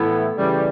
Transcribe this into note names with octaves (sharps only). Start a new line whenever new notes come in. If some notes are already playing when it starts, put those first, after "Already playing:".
Already playing: A2 E3 A3 B3 E4
C#3 E3 G3